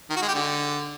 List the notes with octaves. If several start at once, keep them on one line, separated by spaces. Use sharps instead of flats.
D#3
F#4
G#3
G4
D3